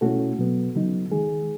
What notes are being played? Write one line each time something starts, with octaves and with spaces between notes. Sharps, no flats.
B2 A3 C#4 E4 F#4 A4
B2 F#3 B3
C#3 F#3 B3 D#4
D#3 G#3 D#4 G#4